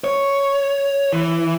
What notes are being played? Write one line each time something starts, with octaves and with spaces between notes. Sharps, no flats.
C#5
E3